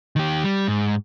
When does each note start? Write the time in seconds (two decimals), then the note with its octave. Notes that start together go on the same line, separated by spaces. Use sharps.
0.16 D#3 G4
0.44 G3
0.68 G#2